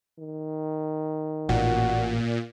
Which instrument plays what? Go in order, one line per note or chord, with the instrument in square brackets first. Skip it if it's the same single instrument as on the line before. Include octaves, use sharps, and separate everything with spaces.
[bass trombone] D#3
[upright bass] A1 [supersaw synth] A#2 [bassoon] F#4